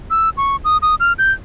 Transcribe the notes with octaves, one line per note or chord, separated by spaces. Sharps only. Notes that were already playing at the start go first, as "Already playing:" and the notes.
E6
C#6
D#6
D#6
F6
G6